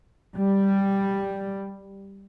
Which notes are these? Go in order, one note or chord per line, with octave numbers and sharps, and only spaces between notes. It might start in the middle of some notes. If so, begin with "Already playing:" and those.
G3